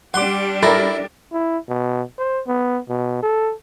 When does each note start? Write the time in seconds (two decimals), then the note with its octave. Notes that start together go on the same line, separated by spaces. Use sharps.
0.14 G3 D4 G4 F#5 C6 D6
0.63 E4 A4 A#4 B5 A6 A#6
1.33 E4
1.69 B2
2.18 C5
2.47 B3
2.89 B2
3.23 A4